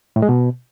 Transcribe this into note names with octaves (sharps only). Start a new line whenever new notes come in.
A2
G#3
B2